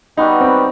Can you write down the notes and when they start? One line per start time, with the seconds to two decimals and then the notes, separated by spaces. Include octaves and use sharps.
0.17 G3 B3 D#4 F#4 B4
0.41 C4